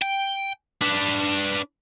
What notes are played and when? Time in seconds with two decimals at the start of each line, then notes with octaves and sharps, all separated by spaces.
0.02 G5
0.81 D4 B4